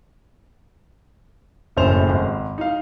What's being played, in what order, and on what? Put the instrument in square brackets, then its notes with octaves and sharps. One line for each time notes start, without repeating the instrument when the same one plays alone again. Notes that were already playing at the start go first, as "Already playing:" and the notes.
[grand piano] F#1 F#2 A2 C5 F7
G#1
D#4 F5